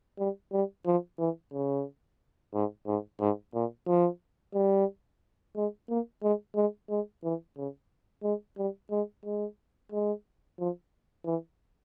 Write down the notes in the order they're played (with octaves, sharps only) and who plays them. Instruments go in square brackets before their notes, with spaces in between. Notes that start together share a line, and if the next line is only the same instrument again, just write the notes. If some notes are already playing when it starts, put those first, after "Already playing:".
[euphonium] G3
G3
F3
E3
C#3
G#2
G#2
G#2
A#2
F3
G3
G#3
A#3
G#3
G#3
G#3
E3
C#3
G#3
G3
G#3
G#3
G#3
F3
E3